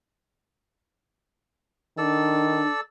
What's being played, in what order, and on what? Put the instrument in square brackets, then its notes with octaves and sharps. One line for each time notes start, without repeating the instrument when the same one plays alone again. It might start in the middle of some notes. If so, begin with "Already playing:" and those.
[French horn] D#3 [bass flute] D4 [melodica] A4 D5 E6